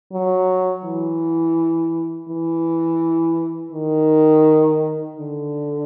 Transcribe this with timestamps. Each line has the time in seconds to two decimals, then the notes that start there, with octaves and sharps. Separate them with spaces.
0.13 F#3
0.84 E3
2.29 E3
3.72 D#3
5.17 D3